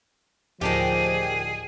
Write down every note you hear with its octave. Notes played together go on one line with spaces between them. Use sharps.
D1 D#3 F3 D4 G4 G#4